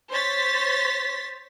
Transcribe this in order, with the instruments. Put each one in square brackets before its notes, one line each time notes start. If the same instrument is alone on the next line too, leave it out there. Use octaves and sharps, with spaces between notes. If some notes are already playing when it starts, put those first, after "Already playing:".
[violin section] C5 C#5 A6 B6